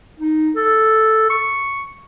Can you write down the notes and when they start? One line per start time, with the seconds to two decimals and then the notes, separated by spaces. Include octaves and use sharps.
0.19 D#4
0.56 A4
1.30 C#6